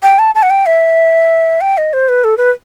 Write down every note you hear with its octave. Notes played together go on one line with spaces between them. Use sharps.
G5
A5
A5
F#5
G5
E5
G5
D#5
C5
B4
A4
B4